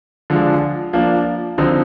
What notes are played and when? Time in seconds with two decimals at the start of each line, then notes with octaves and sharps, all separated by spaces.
0.30 D3 F3 G#3 D4 F4
0.93 F3 A#3 D4
1.58 D3 F3 C4 D#4